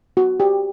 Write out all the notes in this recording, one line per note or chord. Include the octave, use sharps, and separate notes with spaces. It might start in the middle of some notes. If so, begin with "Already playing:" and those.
F#4
G4